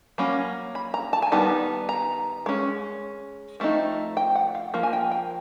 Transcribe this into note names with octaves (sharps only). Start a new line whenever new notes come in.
F#3 A#3 C#4 B5
B5
A#5
A5
G#5
D#3 G3 B3 D#4 A5
A#5
G#3 C#4
F3 A3 C4 D#4
G5
F#5
F5
F3 A#3
G#5
G5
G5